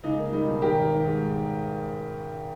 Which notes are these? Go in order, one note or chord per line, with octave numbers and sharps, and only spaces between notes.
C#2 D#4
A#3
G3 D#4
B2
G#1 G4 A#4
G#1
D#3
G#2